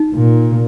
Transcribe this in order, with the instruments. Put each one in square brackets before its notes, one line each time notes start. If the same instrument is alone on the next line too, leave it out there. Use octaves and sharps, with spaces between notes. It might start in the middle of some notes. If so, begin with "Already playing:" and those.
Already playing: [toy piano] D#4
[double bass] A#2